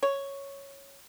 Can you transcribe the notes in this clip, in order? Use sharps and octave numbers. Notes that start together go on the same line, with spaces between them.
C#5